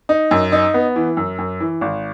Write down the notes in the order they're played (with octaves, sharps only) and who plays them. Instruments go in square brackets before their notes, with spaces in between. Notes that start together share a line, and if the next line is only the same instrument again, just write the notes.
[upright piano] D#4
F#2
D#4
B3
E3
F#2
F#2
E3
G#1